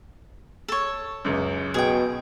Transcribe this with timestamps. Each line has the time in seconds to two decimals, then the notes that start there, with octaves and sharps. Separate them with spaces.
0.68 A4 C#5
1.25 C#2 F#2
1.74 B2 G#4 G5